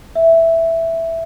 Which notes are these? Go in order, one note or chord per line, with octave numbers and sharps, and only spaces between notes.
E5